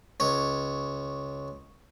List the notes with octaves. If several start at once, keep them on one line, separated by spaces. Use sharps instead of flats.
C#2 C#5